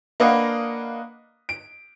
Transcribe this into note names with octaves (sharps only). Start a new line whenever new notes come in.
A#3 D4 B4 D#5 F5 F#5
D7